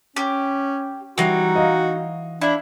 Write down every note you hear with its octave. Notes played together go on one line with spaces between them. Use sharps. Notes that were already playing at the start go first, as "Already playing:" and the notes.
C#4 G4
E3 G3 C4 D#4 F#4 G#6
D#5 F5 G#6
D4 E4 E5 F5